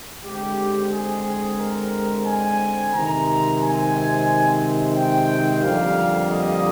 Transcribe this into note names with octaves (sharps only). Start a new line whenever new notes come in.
D3 G#3 C4 G4
G#4
A#4
G#5
C3 D#3 G#3 C4 A#5
G#5
G5
F2 D3 G3 A#3 F5
D#5